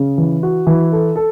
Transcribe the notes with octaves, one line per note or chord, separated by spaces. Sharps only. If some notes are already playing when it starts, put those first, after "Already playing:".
Already playing: C#3
E3
F#4
E3
A4
A4